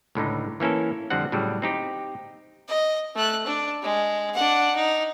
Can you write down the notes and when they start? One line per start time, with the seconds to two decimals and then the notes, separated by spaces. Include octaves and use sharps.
0.15 C#2 A2 D3 D#4
0.60 E3 A#3 C#4 E4 A4
1.10 F2 D3 G3 C4 F#5
1.32 A2 C#3 F#3 G3
1.62 C4 D#4 G4
2.68 D#5
3.16 A3 F#6
3.46 D4
3.82 G#3
4.34 D4 F#5
4.75 D#4